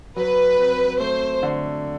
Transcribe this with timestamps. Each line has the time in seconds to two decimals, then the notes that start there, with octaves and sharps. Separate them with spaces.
0.16 F#3 B4
0.58 C4
1.00 A3 C5
1.43 D3